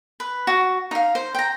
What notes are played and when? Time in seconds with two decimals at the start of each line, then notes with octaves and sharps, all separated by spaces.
0.20 B4
0.47 F#4
0.91 D#4 F5
1.15 C5
1.35 G5 A#5